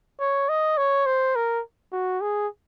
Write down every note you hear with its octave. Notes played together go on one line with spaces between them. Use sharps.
C#5
D#5
C#5
C5
A#4
F#4
G#4